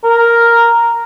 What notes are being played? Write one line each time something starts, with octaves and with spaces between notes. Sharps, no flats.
A#4